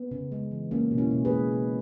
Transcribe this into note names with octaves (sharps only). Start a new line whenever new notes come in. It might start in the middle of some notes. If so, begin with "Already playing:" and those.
Already playing: B3
C#3
G#3
E3
G#3 A#3 C#4
B2
C#4 E4
B2
G#4 B4
G#3
B2